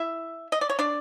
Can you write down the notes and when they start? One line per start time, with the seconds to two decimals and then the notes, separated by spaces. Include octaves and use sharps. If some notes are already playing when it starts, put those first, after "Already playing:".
Already playing: E4 E5
0.52 D#5
0.61 D5
0.69 C#5
0.79 D4 D5